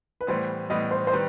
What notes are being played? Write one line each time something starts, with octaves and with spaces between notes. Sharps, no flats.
B4
A2 E3 G3 B3 C5
A2 E3 G3 B3 D#5
C5
C5
D#3 G3 B4